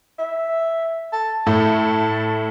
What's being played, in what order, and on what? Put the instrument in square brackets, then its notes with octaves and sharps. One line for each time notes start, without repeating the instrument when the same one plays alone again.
[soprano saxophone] E5
A5
[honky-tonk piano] A2 A3 [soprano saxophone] A5